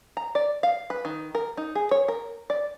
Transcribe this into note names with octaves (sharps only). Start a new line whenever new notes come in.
A#5
D5
F5
B4
D#3
A#4
D#4
G#4
C#5
A#4
D5